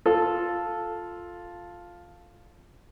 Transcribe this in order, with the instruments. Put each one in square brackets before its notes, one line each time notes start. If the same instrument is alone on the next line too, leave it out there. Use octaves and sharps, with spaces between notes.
[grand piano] F4 F5 [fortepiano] A4